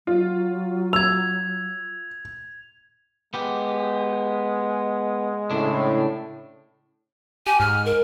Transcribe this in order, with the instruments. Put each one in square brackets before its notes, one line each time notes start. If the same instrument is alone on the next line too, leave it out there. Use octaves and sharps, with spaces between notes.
[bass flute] F#3 [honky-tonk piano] F4
[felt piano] E6 [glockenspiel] G#6 F7
[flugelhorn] G#3 [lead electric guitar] B3 G4
[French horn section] A2 [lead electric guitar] C#3 D4
[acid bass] G4 [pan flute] G#5
[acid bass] G#2 [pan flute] F6
[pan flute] A#4